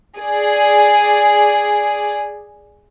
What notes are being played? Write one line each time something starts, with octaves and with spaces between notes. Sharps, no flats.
G#4 D5